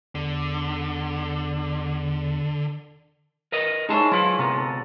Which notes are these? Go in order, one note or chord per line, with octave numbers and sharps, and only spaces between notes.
E2 D3
A#4 B4 D#5
G#3 D#4 E4 C#5 A5
F#3 E4 F4 B4
C3 B3 A#4
A4